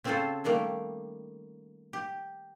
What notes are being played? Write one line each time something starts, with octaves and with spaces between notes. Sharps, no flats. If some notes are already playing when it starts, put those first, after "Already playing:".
C#3 C4 C#4 F4 A4 C5
D#3 G3 A3 A#3
G4